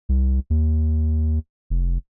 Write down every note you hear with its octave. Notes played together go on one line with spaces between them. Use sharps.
C2
D#2
F1